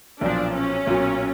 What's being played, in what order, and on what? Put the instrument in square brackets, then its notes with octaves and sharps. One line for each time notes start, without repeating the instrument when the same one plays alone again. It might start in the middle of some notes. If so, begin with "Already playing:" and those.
[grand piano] B1 A#2 F3 [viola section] D4
[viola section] C#4
[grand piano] B1 A#2 F#3